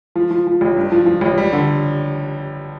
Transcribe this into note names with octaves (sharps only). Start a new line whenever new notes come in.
F3
F3
F3
A1
G2
F3
F3
A1
G3
D3